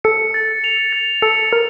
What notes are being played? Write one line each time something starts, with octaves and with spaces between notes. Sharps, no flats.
A4 C#7
A6
F7
A6
A4 C#7
A#4 A6